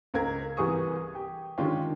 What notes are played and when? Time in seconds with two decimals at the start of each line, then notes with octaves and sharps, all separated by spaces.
0.14 C#2 A#4 G#6
0.57 C2 E3 G#4 A#4 C#6 D#6
1.15 G4
1.58 D3 D#3 G#3 C#4 F4 G4